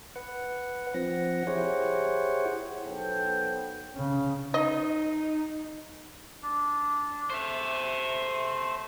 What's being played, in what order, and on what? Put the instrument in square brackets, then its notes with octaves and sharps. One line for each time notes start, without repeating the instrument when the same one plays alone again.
[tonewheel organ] B4 F#5
F3 C4 F#5 A#6
E4 G4 G#4 C5 C#5 F#5
[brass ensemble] B1 B3 A4 C5 G5
[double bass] C#3
[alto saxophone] D#4 [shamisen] D#5
[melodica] D4
[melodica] A3 [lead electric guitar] C5 E5